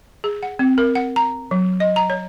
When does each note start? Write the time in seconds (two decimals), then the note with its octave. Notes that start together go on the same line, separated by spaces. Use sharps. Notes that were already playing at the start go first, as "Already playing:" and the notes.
0.24 G#4
0.43 F#5
0.59 C4
0.78 A#4
0.95 F#5
1.16 A#5
1.51 F#3
1.80 D#5
1.96 A#5
2.10 C#5